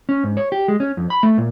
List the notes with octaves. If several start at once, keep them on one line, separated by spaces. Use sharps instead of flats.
C#4
G#2
C#5
G4
G#3
C#4
F2
B5
A3
A#2